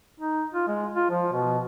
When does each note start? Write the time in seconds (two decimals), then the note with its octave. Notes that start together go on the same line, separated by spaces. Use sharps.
0.20 D#4
0.54 F4
0.68 G#3
0.96 F4
1.10 F3
1.33 B2